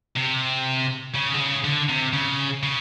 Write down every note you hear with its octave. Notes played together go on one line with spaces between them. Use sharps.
C3
C#3
D3
C#3
D3
C3
C#3
C#3